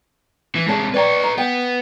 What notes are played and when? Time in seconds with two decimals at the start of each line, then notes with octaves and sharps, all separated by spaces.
0.56 E3
0.68 C3 G#3 C#5 A5
0.94 B4 C#5 D5 G5 A#5
1.23 A#5
1.38 B3 G5